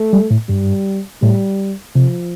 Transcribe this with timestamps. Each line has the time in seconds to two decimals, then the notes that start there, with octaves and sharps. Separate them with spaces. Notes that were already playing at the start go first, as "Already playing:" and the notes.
Already playing: A3
0.13 G3
0.31 A2
0.49 G2 G3
1.22 A2 G3
1.95 C3 F3